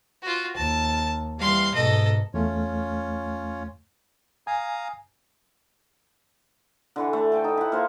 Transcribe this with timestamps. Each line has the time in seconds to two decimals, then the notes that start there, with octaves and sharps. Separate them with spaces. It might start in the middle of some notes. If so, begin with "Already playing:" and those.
0.22 F4 F#4
0.56 D#2 A5
1.39 E3 G3 F5 C6
1.74 G#2 B2 A4 D#5
2.34 E2 A3 C#4 F4 C#5
4.47 F5 G#5 A#5 D#6
6.96 D3 E3 C#6
7.13 A3
7.32 A4 G5 G#5
7.44 D#4 G5
7.57 E4 F#5
7.72 A#3 F4 C5 F#5